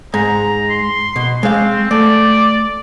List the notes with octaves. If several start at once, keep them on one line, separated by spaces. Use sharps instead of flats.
G#2 A#5
C6
B2
G#3 C4 F5
A3 D5